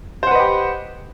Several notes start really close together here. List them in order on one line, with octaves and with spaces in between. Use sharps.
C5 F#5 B4 D#5 G4